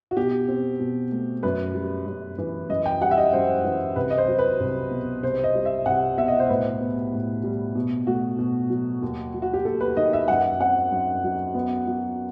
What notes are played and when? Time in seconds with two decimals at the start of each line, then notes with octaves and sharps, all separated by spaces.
0.11 F#4
0.17 B2 G4
0.48 C4
0.80 B2
1.12 A3
1.43 F#2 B4
1.74 G3
2.07 F#2
2.38 E3
2.69 F#2 D#5
2.86 G5
3.01 G3 F#5
3.11 E5
3.17 D#5
3.33 F#2 C5
3.64 E3
3.96 C2 B4
4.10 D#5
4.18 C5
4.28 F#3
4.38 B4
4.60 C2
4.91 B2
5.23 C2 C5
5.44 D#5
5.55 G3
5.65 E5
5.86 C2 F#5
6.17 B2 E5
6.28 D#5
6.39 C5
6.49 A2 B4
6.80 B3
7.13 A2
7.43 G3
7.75 B2
8.07 A3 F#4
8.39 B2
8.70 F#3
9.02 D#2
9.34 F#3
9.42 F#4
9.53 G4
9.65 D#2 A4
9.80 B4
9.97 D#3 D#5
10.13 E5
10.28 F#2 F#5
10.60 C4 F#5
10.91 F#2
11.24 F#3
11.54 B3
11.87 F#3